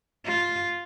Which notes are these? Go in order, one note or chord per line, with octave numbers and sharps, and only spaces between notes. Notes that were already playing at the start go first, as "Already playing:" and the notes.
F4